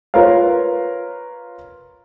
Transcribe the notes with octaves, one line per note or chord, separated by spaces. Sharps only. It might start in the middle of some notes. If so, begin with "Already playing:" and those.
F4 A#4 B4 C#5 F5